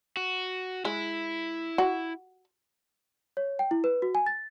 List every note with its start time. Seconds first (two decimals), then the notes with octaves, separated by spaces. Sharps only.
0.17 F#4
0.85 G#3 E4
1.78 F#4
3.37 C#5
3.59 G5
3.71 E4
3.84 B4
4.02 F#4
4.15 G#5
4.26 A6